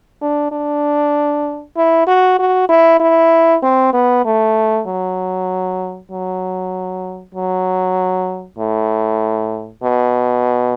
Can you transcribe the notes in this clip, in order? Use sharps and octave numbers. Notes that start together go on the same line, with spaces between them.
D4
D4
E4
F#4
F#4
E4
E4
C4
B3
A3
F#3
F#3
F#3
A2
B2